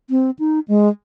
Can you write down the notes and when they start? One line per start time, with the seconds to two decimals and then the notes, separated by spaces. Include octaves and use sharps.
0.10 C4
0.39 D#4
0.68 G#3